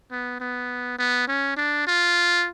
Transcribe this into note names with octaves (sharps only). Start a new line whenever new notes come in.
B3
B3
B3
C#4
D4
F4